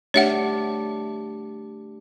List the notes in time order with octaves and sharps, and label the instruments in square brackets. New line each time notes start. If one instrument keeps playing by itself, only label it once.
[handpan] A3 D4 G4 [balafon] C#5 E5 F#5